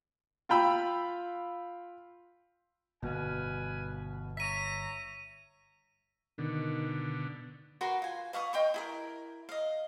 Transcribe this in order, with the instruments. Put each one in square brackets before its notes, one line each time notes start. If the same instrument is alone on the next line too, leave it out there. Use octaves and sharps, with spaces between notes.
[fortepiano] F4 G5 B5 E6
[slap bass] G1 [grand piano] B2 [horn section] B4 F5 G#5
[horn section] C#5 E5 A#5 [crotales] B6 D#7
[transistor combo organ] B2 D3 [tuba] D#3
[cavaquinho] F#4 A#4 B4 C6
F4 G#5
B4 F5 C#6 D#6
D#5 G5 C6 C#6
E4 G#4 A#4
D#5 F5